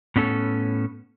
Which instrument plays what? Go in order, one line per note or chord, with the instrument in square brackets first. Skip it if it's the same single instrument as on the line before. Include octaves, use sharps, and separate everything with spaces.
[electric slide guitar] A2 B3 C#4 A4